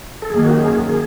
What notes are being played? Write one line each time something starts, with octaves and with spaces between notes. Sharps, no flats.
A4
F#2 D#3 F#3 A#3 G#4
F#4
G4
G#4
G#4